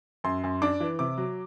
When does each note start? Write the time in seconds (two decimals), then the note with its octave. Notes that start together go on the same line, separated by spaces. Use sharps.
0.24 F#2 C6
0.44 F#2
0.62 D4 D6
0.80 E3
0.99 C3 D6
1.18 F#3